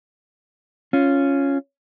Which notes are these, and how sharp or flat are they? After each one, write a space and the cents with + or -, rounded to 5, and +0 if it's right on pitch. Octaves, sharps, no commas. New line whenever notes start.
C#4 +0 F4 +0